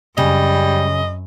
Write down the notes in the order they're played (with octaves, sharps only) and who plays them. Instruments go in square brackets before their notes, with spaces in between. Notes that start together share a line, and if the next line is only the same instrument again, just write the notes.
[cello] F#2 [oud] C#3 [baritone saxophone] G3 [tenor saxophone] D#5